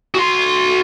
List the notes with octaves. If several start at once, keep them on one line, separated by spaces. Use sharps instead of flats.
F#4 C6